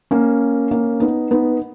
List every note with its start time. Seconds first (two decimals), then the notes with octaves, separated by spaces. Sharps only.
0.11 A#3 C#4
0.71 A#3 C#4
1.00 B3 D#4
1.31 B3 D#4